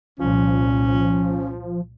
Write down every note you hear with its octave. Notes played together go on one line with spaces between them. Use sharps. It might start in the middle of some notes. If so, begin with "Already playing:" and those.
C2 A#2 F3 C#4